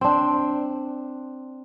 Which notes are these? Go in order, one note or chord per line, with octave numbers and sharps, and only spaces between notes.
C4 D4